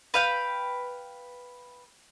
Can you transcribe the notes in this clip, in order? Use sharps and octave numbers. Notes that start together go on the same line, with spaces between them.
B4 F5 G5